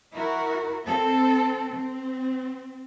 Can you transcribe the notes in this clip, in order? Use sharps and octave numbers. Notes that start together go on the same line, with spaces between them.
E4 F#4 A#4
C4 A4
C4